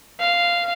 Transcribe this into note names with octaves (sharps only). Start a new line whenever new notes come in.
F5